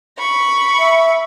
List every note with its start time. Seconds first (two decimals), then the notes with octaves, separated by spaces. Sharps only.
0.17 B5 C#6
0.79 E5